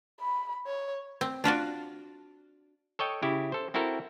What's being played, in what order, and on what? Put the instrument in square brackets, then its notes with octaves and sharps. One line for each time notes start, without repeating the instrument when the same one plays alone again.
[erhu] B5
C#5
[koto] C4
D4 F4 F#4 D5
[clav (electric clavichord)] A4 C#5 D#5 G5
C#3 E4 G4
A4 C5
C4 E4 F#4 A4 A#4